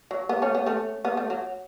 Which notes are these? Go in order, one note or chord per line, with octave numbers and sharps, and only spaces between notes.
F#3
B3
A3 C#4
B3
A3 C#4
B3
A3
F#3